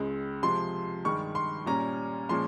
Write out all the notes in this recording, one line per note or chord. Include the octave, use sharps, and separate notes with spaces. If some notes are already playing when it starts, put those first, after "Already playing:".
Already playing: C#2 C#3 G#3
C3 F3 G#3 C6
G2 D#3 G#3 C#6
C6
A#2 G3 C#4 A#5
A#2 F3 G#3 C#4 C6